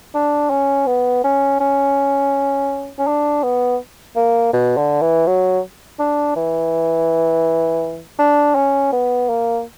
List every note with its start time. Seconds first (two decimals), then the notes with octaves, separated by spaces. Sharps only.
0.15 D4
0.51 C#4
0.87 B3
1.24 C#4
1.60 C#4
2.99 C#4
3.07 D4
3.44 B3
4.16 A#3
4.53 B2
4.77 D3
5.02 E3
5.27 F#3
5.99 D4
6.36 E3
8.19 D4
8.55 C#4
8.93 B3
9.29 A#3